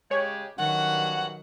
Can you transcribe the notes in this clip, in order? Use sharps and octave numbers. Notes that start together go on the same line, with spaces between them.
C#3 G#3 G4 C#5
G2 D#3 F#3 C#4 F#4 F#5